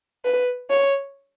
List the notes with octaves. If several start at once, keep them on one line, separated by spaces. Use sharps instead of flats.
B4
C#5